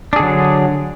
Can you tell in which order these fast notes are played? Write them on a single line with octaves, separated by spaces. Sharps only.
D4 G#4 D3 F#3